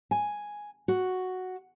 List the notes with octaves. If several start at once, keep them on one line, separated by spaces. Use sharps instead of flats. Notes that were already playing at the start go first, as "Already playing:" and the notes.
G#5
F#4